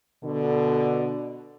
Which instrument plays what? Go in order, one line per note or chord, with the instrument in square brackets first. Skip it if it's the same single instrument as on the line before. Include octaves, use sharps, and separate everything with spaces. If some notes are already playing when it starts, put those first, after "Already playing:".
[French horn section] B2 D3